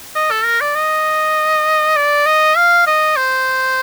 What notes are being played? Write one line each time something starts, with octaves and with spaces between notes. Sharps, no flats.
D#5
A4
A#4
D5
D#5
D5
D#5
F5
D#5
C5